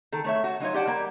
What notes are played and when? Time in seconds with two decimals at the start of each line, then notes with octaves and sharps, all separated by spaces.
0.12 D#3 A4
0.24 A3 C#5 E5
0.44 A3 F#4
0.60 F#3 D#4 F4 C#5
0.74 G4 D5 F#5 A5
0.87 G3 A#3